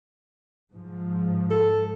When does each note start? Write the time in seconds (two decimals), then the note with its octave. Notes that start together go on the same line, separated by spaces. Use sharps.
0.71 G#2 F3
1.51 A4